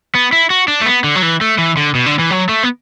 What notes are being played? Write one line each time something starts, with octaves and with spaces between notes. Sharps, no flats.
B3
E4
F#4
D4
A3
B3
D3
F#3
E3
A3
E3
D3
B2
D3
E3
F#3
A3
B3